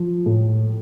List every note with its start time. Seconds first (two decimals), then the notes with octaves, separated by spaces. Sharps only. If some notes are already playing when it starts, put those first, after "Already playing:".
Already playing: F3
0.26 A2